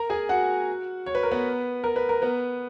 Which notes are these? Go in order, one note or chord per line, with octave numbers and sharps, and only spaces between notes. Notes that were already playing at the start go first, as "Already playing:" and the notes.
Already playing: A#4 A#5
G#4 G#5
F#4 F#5
C#5
B4
A#4
B3 B4
A#4
B4
A#4
B3 B4